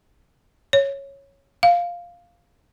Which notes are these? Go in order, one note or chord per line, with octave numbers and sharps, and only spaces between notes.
C#5
F5